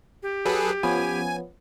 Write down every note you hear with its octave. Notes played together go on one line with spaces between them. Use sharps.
G4
F#3 G#4 A4 B4
F3 B3 C#4 G#5